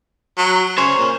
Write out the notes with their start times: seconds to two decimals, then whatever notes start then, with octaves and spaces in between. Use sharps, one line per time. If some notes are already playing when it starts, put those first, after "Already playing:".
0.38 F#3
0.78 C#3 C5 C#5
0.98 A#2